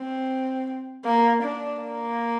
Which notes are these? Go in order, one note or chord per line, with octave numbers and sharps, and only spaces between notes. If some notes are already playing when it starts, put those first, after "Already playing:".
Already playing: C4
A#3
D4
A#3